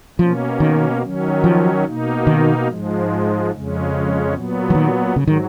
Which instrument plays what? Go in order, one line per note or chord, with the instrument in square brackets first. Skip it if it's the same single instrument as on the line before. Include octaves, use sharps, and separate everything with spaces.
[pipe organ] B2 A#3 C#4 [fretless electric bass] F3
[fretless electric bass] D#3
[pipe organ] D#3 F#3 C#4
[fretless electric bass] F3
[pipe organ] B2 A#3 D#4
[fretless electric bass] D#3
[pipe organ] G#2 F3 G#3
F2 C#3 G#3 C#4
A#2 F#3 B3
[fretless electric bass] F3
D#3
[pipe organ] G#2 F#3 [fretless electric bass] C#3
[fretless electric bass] D#3